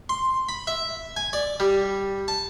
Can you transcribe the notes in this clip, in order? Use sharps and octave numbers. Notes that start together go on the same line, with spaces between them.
C6
B5
E5
G#5
D5
G3
A5